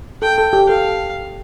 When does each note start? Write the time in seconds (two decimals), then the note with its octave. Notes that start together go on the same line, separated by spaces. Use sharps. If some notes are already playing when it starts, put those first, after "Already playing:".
0.22 A4 G5
0.38 A4
0.53 G4
0.69 A4 F5